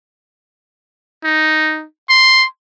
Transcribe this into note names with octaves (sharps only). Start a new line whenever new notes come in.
D#4
C6